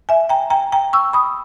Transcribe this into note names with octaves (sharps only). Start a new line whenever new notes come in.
E5 G#5
G5 A#5
G5 A#5
G5 A#5
C#6 E6
B5 D#6